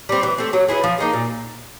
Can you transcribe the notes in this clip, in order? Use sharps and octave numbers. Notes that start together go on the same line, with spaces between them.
G3 C4
E3
A3 C4
F#3
B3 E4 G#4
F3
A#3 D#4 G#4
A#2